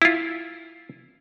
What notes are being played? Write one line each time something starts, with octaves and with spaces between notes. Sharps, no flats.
E4 F4